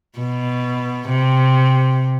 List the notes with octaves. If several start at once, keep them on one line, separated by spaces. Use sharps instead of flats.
B2
C3